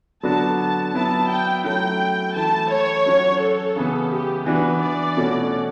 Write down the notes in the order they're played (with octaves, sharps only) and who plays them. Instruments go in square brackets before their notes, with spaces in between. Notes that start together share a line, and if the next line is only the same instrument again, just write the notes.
[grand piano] D3 F#3 B3 D4 F#4 [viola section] A5
[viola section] A5
[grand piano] F#3 B3 E4 [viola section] A5
[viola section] G5
[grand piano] F#3 A3 C#4 E4 [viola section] G5
[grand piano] E3 A3 E4 [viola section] A5
[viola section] C#5
[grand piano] F#3 C#4 F#4
[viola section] A4
[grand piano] C#3 E3 B3
[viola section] G4
[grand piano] E3 B3 D4 F#4 [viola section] B4
[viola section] D5
[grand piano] B2 A3 C#4 F#4